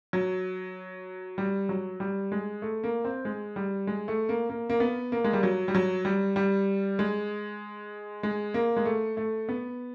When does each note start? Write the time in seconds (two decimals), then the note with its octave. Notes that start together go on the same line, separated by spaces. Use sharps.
0.13 F#3
1.38 G3
1.69 F#3
2.00 G3
2.32 G#3
2.62 A3
2.84 A#3
3.05 C4
3.25 G#3
3.56 G3
3.87 G#3
4.08 A3
4.29 A#3
4.50 A#3
4.70 A#3
4.80 B3
5.12 A#3
5.24 G#3
5.33 G3
5.43 F#3
5.68 G3
5.75 F#3
6.05 G3
6.36 G3
6.99 G#3
8.23 G#3
8.54 A#3
8.77 G#3
8.85 A3
9.17 A3
9.49 B3